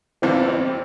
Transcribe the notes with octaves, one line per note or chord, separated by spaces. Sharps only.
E2 E3 G3 C4 D4 F4
C4